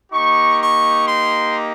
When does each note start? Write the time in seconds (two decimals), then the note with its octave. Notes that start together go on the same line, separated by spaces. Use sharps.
0.12 A#3 D#4 G4 C#6
0.60 C#6
1.06 C6